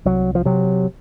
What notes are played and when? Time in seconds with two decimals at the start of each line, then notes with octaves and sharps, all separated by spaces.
0.05 C2 F#3
0.35 F3
0.45 C3 F#3